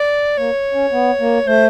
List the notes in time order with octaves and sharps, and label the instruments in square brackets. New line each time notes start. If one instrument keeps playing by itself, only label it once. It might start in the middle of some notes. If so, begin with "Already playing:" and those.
Already playing: [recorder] D5
[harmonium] A#3 [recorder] C#5
[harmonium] C#4
B3
A#3
[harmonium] A3 [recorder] C5